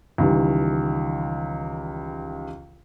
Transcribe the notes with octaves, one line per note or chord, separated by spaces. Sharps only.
C#2 D#3 E3 G3